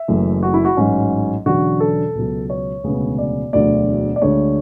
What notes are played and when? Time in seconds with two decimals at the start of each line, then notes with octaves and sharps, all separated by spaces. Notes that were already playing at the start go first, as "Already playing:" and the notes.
Already playing: E5
0.08 F#1 F#2 E3 A3
0.43 F#4
0.54 E4
0.65 F#4
0.77 A1 G#2 F#3 C#4
1.46 E1 E2 D3 F#3 C#4 F#4
1.80 A4
2.15 C#2 B2 F#3
2.50 C#5
2.84 E1 D2 C#3 G#3 B3
3.18 D5
3.53 E1 D2 D3 F#3 A3 D5
4.16 D5
4.22 D2 D3 G#3 C#5